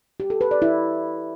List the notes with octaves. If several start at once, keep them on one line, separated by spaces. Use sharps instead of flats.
G4
A4
B4
D5
E4